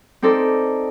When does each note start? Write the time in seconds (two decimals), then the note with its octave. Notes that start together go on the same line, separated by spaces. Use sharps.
0.22 C4 D#4 A4 D5